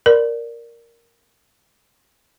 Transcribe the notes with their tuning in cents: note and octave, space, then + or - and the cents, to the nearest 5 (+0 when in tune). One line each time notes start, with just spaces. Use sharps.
A#4 +0 D5 +0